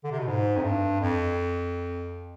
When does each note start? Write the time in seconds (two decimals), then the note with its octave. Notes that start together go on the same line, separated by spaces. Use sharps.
0.04 D3
0.11 C3
0.19 B2
0.26 G#2
0.56 F2
0.63 G2
1.01 F2